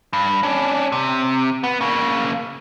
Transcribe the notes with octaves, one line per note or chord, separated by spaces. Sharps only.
G2
C#4 D4
C3
B3
C#3 A#3